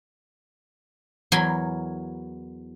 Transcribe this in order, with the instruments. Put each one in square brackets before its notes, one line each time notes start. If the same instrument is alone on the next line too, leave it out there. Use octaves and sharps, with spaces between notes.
[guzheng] E2 F#3 A#4 G#5 B5 C6